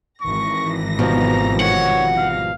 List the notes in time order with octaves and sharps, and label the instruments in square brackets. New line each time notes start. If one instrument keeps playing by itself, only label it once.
[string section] G#1 E3 A#6 [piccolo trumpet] C#6
[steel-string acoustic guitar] B2 F3 G3 [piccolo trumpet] A#5
[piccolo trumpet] C#5 [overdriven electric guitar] F#5
[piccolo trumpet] F5